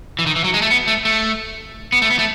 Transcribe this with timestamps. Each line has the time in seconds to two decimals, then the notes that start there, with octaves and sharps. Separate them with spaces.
0.19 E3
0.26 D#3
0.36 E3
0.44 F#3
0.54 G#3
0.62 A3
0.71 B3
0.88 A3
1.05 A3
1.92 B3
2.02 A3
2.10 B3
2.19 A3